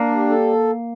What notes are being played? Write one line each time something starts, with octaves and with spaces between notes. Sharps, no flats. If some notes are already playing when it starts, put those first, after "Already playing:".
Already playing: A#3 D4
G3
A4